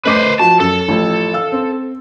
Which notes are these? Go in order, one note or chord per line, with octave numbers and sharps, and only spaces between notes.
A3 B4 C5 D#5 D6
F3 F#4 A5
F#2 A4
A1 F3
F5 E6
C4